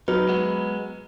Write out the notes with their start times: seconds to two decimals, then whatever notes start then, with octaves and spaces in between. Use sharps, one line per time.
0.08 F#3 D#4 B4
0.29 G#3 B3